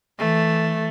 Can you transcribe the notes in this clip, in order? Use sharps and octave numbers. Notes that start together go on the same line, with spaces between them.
E3 A3